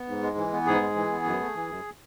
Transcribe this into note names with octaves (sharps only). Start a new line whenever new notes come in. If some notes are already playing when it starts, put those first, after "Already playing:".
Already playing: B3
G#2
G#3
E3
B3
G#2 G#4
G#3
E3
B3
F#2
A3
E3
F#2